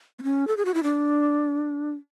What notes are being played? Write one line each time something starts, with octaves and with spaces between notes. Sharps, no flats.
B3
C#4
A4
G#4
F#4
E4
D4